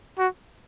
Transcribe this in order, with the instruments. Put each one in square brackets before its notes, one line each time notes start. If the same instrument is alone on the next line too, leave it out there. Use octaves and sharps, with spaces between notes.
[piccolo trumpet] F#4